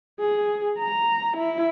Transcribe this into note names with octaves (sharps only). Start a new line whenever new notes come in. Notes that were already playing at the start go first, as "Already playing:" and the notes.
G#4
A#5
E4